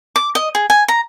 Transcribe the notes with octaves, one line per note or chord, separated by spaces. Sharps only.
D6
D#5
G#4
G#5
A#5